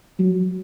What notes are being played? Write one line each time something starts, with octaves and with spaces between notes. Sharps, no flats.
F#3